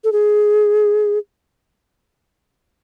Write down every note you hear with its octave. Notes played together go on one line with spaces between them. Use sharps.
A4
G#4